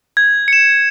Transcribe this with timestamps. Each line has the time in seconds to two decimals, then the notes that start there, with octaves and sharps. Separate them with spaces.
0.17 G#6
0.48 C#7 E7